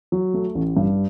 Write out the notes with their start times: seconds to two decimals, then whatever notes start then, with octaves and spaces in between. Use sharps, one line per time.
0.12 F#3
0.34 A3
0.55 A1
0.77 G2